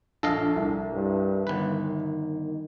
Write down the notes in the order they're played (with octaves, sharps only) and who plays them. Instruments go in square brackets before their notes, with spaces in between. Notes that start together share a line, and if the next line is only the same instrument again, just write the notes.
[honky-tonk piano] A#1 [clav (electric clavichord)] A4 D#5 F5
[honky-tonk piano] C2
[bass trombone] G2
[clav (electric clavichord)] G1 B4 [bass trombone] D#3